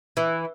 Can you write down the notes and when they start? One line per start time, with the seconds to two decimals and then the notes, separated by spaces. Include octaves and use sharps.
0.17 E3